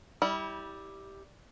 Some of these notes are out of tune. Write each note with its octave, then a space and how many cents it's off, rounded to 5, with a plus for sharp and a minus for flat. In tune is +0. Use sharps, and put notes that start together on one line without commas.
G3 +0 E4 -30